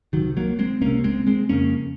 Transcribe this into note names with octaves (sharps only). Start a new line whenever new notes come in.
C#2 C3 D#3 F#3
F#3 A#3
G#3 C4
C#2 C3 A#3 C#4
G#3 C4
G#3 C4
F2 C#3 A#3 C#4